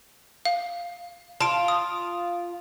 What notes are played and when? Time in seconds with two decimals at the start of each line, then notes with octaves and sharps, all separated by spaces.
0.45 F5
1.41 F4 A5 D7
1.68 D#6